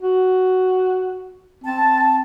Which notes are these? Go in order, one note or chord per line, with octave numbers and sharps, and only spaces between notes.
F#4
C4 A5